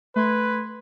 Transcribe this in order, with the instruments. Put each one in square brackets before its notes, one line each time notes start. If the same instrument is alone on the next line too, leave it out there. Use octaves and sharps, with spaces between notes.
[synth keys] A3 C6 G#6 [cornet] B4